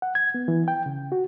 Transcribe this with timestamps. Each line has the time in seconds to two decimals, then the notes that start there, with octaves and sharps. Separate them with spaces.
0.02 F#5
0.15 G#6
0.34 B3
0.48 E3
0.68 G5
0.86 C#3
1.12 F#4